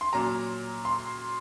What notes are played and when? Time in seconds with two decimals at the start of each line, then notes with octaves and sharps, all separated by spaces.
0.01 C6
0.13 A#2 F#3 A#5
0.85 C6